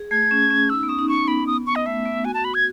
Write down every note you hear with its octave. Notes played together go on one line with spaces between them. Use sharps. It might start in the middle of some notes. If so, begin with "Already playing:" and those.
Already playing: G#4
A3 G#6
C#4
C#4
D#4 E6
B3
C#4 D#6
D#4
C#4 C#6
B3 B5
D#6
C#6
D#5
A3 E5
B3
F#4 G#5
A5
B5
G#6